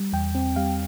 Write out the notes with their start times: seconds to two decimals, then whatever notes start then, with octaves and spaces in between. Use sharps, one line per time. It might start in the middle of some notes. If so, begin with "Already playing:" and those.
Already playing: G3
0.13 E2 G5
0.35 C4
0.56 G3 F5